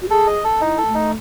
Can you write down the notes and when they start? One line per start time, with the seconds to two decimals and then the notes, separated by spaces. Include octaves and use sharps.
0.02 F#4
0.09 G#4 A4
0.27 D#5
0.44 A4
0.61 D#4 E4
0.78 A4
0.87 A3
0.94 D#4